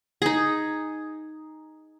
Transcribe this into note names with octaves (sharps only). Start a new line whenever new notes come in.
D#4 G#4